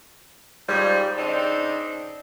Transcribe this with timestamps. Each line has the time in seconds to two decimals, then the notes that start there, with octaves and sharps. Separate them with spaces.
0.69 G#2 F3 G3
1.17 C#3 C4 D4 D#4